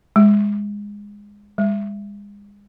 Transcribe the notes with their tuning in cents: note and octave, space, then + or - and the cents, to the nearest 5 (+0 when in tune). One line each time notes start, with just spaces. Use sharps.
G#3 -20
G#3 -40